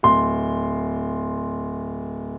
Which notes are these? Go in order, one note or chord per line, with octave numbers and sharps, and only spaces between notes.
D1 C6